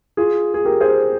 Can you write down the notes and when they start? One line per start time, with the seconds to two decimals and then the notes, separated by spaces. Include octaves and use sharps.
0.17 F4 G#4
0.54 G#4
0.65 G4 A#4
0.80 G#4 C5